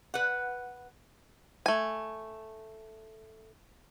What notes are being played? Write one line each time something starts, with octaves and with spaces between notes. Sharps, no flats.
B4 F#5
A3 G#5